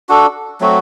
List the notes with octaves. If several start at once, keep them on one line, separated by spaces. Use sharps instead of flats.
D4 F#4 A4
F#3 A3 C4 F#4